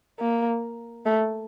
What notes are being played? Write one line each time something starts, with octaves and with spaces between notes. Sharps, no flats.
A#3
A3